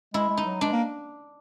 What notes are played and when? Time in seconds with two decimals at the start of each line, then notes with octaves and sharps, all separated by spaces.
0.14 G#3 E4
0.30 G#3
0.37 D#4
0.45 F#3
0.61 G#3 D4
0.72 A#3